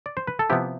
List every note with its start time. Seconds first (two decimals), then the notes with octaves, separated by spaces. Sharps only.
0.06 D5
0.17 C5
0.27 B4
0.39 A4
0.49 C3 F3 B3 E4 G4